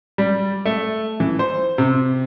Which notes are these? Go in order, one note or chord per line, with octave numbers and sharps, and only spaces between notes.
G3
A3
E3
C5
C3